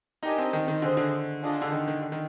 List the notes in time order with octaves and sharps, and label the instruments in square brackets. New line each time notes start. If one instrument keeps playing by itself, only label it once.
[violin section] D4 G4 A#4 D#5 G#5 [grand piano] D#4
[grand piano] C4
D#3
D#3
[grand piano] D3 [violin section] G#4 C5 D#5
[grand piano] D3
[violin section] D4 F4 G#4 D#5
[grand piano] D3
D#3
D#3
D3
D#3